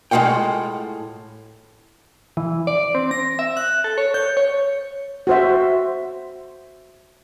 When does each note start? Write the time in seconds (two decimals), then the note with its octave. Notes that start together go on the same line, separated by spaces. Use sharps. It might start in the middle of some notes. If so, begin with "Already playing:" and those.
0.11 A2 G#3 D#4 F4 F#5 G5
2.37 E3
2.67 D5
2.95 C4
3.11 A#6
3.39 E5
3.57 F#6
3.84 A4
3.98 C#5
4.14 G6
4.37 C#5
5.27 F#4 C5 E5